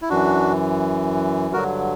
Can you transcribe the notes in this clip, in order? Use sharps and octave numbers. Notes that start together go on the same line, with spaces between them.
E4
F#2 E3 D4 F#4
G2 D3 F#3 F#4 A#4